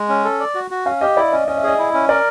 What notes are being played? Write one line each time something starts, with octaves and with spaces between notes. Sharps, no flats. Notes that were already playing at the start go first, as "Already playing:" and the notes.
Already playing: G#3
C#4
A4
D5
F#4
F#4
C#4 F5
G4 D#5
E4 D5
C#4 D#5
C#4 D#5
E5
G#4 D#5
E4
C#4
A#4 D5